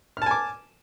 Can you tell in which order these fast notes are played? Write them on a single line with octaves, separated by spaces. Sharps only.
F6 A5 G#5 D6